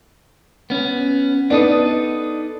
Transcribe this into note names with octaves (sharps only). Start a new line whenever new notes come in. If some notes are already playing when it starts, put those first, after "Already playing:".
B3 C#4
B3 D4 D#4 A4 D#5